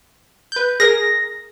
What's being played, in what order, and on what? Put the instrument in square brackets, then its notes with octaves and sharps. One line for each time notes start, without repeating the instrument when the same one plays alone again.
[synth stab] B4 G6
[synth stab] G#4 A#4 [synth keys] A#6